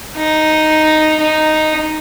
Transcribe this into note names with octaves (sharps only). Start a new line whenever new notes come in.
D#4
D#4